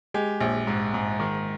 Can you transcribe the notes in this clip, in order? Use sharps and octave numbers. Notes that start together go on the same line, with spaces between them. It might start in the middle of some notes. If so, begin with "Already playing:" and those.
G#3 G4
A#1
G#2
G#2
D#3